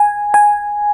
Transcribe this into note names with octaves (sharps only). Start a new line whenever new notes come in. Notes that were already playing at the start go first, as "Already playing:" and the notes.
Already playing: G#5
G#5